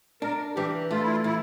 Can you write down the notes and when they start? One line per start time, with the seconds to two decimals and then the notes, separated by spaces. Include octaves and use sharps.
0.22 D4 A#4
0.56 E3 G4
0.91 A3 F4
1.01 E4
1.11 F4
1.24 E3 E4